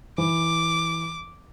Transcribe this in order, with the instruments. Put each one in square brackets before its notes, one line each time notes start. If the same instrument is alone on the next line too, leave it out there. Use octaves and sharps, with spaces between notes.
[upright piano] E3 [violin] D6